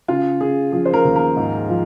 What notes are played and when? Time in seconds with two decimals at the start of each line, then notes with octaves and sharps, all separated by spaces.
0.08 C#3 F4
0.40 C#3 G#4
0.72 F3 G#4
0.86 C5
0.93 A#4
1.05 D#2
1.16 A#4
1.36 G#2
1.69 F3